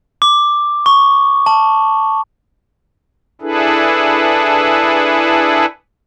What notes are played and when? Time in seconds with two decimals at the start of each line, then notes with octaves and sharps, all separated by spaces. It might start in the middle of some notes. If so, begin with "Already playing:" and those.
0.22 D6
0.86 C#6
1.46 A5
3.41 D4 E4 G#4 A4 B4